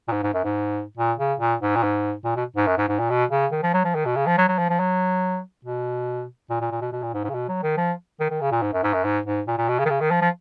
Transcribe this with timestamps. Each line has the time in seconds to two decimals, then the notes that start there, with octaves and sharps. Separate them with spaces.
0.08 A#2
0.12 G#2
0.23 G#2
0.34 F#2
0.44 G#2
0.98 A#2
1.19 C#3
1.40 A#2
1.61 G#2
1.77 A#2
1.83 G#2
2.25 A#2
2.36 B2
2.56 G#2
2.67 F#2
2.78 G#2
2.89 G#2
2.99 A#2
3.10 B2
3.31 C#3
3.52 D#3
3.63 F3
3.74 F#3
3.85 F3
3.95 D#3
4.05 B2
4.16 C#3
4.27 F3
4.38 F#3
4.48 F#3
4.59 F3
4.70 F3
4.80 F#3
5.65 B2
6.50 A#2
6.61 A#2
6.71 A#2
6.81 B2
6.93 B2
7.03 A#2
7.14 G#2
7.24 G#2
7.29 C#3
7.34 B2
7.49 F#3
7.63 D#3
7.77 F3
8.20 D#3
8.30 D#3
8.41 C#3
8.52 A#2
8.62 G#2
8.73 F#2
8.84 G#2
8.94 F#2
9.04 G#2
9.26 G#2
9.48 A#2
9.58 A#2
9.69 B2
9.79 C#3
9.85 D#3
9.90 C#3
10.00 D#3
10.11 F3
10.22 F3